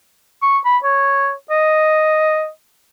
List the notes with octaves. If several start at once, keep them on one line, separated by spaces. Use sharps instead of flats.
C#6
B5
C#5
D#5